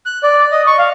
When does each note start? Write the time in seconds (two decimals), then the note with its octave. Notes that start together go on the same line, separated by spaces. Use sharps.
0.06 F#6
0.23 D5
0.52 D#5
0.67 C#6
0.78 F5